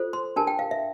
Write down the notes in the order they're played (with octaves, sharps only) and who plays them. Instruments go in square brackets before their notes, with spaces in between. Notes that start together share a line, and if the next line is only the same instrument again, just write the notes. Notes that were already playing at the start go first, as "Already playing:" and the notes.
Already playing: [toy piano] F4 A4 C5
C6
D4 G4 A#4 A5
G5
F5
E5